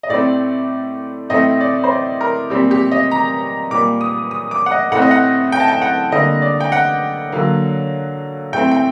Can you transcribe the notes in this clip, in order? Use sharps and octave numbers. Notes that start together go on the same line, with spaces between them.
D#5
A2 A3 C4 D5
A2 A3 C4 D#5
D5
C5
D5
A#4
A#2 G3 C4 G4
G4
D#5
A#5
A#2 G3 A#3 D6
D#6
D#6
D6
F#5
D#5
A2 A3 C4 F#5
D#5
F#5
G5
A5
G5
F#5
D3 G3 A#3 D#5
D5
G5
F#5
D3 F#3 A#3
A2 A3 C4 G5
G5